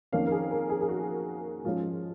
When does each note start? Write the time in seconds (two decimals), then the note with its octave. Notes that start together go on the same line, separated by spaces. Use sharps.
0.12 F2 D#3 A#3 C#4 F5
0.27 A#4
0.31 G#4
0.51 A#4
0.70 G#4
0.81 G#4
0.89 F#4
1.64 G#2 F3 G#3 C#4 F4